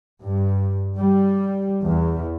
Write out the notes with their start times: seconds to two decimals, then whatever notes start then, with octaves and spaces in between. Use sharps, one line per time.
0.24 G2
0.97 G3
1.86 E2